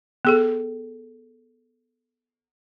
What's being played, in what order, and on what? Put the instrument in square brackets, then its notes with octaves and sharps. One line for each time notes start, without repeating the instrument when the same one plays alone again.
[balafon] B3 G#4 A4